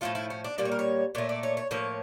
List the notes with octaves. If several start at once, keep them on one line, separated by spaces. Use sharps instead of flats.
A2 F3 A3 F4
E4
C#4
D4
A#2 G3 A#3 D5
C#5
A#4
C#5
A#2 A3 C#5
D5
C#5
C#5
A2 F3 A#3 C#5